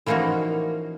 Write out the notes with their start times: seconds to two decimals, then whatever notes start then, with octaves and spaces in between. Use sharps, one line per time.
0.06 E3 F3 A#3 C#4 D#4 F#4